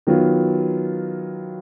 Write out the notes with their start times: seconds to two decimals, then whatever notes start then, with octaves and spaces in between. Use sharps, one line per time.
0.07 D#3 F#3 B3 F4